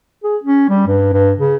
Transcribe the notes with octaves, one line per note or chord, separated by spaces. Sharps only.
G#4
C#4
G3
G2
G2
C#3